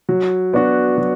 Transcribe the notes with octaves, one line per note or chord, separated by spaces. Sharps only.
F#3
B3 D4 F#4
F#3